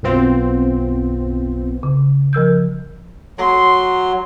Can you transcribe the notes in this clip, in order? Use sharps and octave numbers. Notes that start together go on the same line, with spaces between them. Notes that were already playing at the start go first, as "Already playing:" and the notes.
B1 F#2 B3 C4 F4
C#3
F3 A#4 E6 G6
F#3 C6